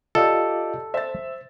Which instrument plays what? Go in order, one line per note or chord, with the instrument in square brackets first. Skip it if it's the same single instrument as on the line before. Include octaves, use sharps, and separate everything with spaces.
[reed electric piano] F4 D#5 F5 [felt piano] G4 D5 [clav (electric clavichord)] A4
[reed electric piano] C5 [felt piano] E5 A6